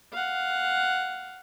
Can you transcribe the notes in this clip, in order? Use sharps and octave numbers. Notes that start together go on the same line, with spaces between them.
F5 F#5